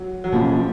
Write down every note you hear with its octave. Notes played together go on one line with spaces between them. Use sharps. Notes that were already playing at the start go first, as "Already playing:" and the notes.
Already playing: F#3
F#3
B2 F3 A#3 C#4
F3